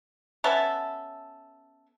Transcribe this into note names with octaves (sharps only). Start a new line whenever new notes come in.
B3 C#4 A4 E5